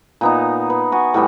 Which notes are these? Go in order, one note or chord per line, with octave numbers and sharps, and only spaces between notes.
A#2 B3 D#4
B4
F#4 G#5
A2 E3 G3 B3